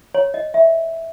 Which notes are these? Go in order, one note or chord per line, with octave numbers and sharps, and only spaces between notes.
C#5
D#5
E5